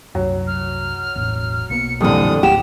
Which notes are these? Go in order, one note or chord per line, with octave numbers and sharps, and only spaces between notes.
C2 F#2 F#3
F6
E1 A1
B1 A#3 B3 C#7
F2 A#2 D3 E3 G3 D#6
D1 A1 F#3 G4 F#5 E7